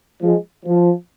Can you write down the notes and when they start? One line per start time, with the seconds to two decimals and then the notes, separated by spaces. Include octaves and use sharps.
0.22 F3 G#3
0.65 F3